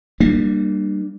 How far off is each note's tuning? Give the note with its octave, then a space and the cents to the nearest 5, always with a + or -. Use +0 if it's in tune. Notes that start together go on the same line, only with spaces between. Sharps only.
G3 +0 A#3 +0 D4 +35